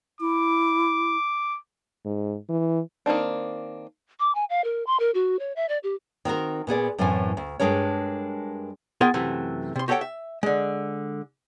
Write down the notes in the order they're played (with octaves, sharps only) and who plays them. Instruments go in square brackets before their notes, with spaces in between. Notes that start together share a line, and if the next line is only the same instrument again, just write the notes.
[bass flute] E4 [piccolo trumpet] D6
[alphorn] G#2
E3
[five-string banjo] D#3 A#3 C4 D4
[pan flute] D6
G#5
F5
A#4
C6
A#4
F#4
C#5
E5
D5
G4
[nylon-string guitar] D#3 C4 F#4 A#4
A#2 B3 G#4 D5
F#2 A2 E3 C4 G#5
D2
G2 C3 G#3 D4 A#4 C#5
[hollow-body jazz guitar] B3 F4 G#4 A#4 E5 G5
F#2 C3 E3 A3
C3 C6
F#4 G4 A4 C#5 F#5 G5
E5
D3 G#3